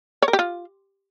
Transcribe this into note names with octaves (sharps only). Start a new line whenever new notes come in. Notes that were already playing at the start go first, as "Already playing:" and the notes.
C#5
A#4
G4
F4